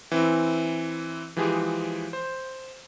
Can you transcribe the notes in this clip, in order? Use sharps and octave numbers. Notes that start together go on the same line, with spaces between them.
E3 C4
E3 F3 G#3 G4 G#4
C5